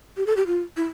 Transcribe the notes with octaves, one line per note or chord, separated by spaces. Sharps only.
G4
A4
G4
F4
E4